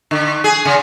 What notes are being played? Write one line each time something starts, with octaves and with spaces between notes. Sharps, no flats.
D3
G#4
C#3